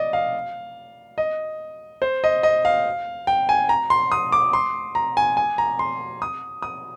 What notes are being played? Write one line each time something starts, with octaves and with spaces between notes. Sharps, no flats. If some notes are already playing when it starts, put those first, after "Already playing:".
Already playing: D5 D#5
F5
D#5
C5
D#5
D#5
F5
G5
G#5
A#5
C6
D#6
D6
C6
A#5
G#5
G#5
A#5
C6
D#6
D#6